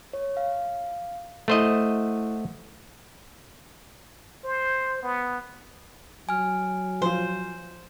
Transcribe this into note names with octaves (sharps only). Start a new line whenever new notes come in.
C#5
F5
A3 E4 C5 D#5 F#5 C#6
C5
B3
F#3 G#5 F6
F3 F4 C5